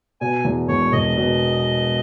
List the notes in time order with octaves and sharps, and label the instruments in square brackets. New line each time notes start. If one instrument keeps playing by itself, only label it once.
[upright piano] B2 [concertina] G#5
[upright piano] E2
[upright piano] E1 [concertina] C#5
[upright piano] E1 [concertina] D#5
[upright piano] B2